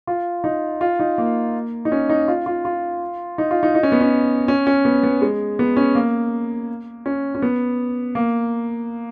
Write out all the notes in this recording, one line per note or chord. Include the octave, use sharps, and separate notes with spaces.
F4
D#4
F4
D#4
A#3
D#4
C#4
D#4
F4
F4
F4
D#4
F4
D#4
D#4
C#4
B3
C#4
C#4
C#4
B3
B3
G#3
B3
C#4
A#3
C#4
C#4
B3
A#3